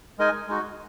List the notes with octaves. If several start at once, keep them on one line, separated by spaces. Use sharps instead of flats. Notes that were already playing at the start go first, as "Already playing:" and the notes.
G#3 D#4 A#4 D#5 G#5
G#3 D#4 F#4